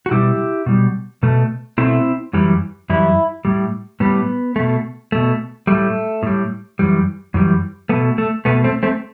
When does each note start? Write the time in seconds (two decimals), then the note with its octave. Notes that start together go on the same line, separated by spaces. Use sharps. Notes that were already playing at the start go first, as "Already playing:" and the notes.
0.06 F#4
0.11 B2 G3 E4 G4
0.66 B2 G3
1.23 B2 A3
1.78 B2 A3 C4 E4
2.33 F#2 E3 G3
2.90 F#2 E3 G3 E4
3.45 A2 G3
4.00 A2 G3 B3
4.56 B2 A3
5.12 B2 A3
5.67 A2 G3 A3
6.23 A2 G3
6.79 F#2 E3 G3
7.34 F#2 E3 G3
7.89 B2 A3 B3
8.18 A3
8.45 B2 A3 B3
8.64 A3 C4
8.83 A3 C4